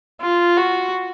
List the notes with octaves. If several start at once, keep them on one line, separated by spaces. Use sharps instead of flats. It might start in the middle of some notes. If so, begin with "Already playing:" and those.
F4
F#4